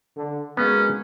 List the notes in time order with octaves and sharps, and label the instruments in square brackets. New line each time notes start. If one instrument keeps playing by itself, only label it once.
[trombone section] D3
[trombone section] F#3 G#3 A#3 [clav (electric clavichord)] B3 [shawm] C#4